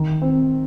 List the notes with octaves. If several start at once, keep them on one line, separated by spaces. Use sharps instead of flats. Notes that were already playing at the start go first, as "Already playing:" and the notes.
Already playing: D#3
C4